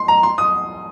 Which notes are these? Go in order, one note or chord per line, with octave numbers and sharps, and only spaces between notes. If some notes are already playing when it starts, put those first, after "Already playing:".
Already playing: C6
A#5
C6
D#6